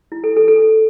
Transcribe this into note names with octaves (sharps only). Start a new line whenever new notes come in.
E4
A4
A4
A4